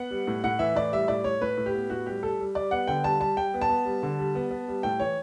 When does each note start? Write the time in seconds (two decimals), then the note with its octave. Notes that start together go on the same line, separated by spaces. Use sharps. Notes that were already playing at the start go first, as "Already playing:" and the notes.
Already playing: B3 F#5
0.11 G3
0.27 A2
0.44 A2 F#5
0.59 E3 E5
0.75 A2 D5
0.92 G3 E5
1.08 A2 D5
1.24 A2 C#5
1.41 A2 B4
1.57 A2
1.66 G4
1.74 B3
1.90 A2 F#4
2.06 G3 G4
2.23 G3 A4
2.40 G3
2.55 G3 D5
2.71 B3 F#5
2.87 D3 G5
3.04 G3 A5
3.20 G3 A5
3.37 G3 G5
3.54 B3
3.61 A5
3.69 B3
3.85 G3
4.03 D3
4.19 G3
4.35 B3
4.51 B3
4.68 G3
4.83 A2 G5
5.00 E3 C#5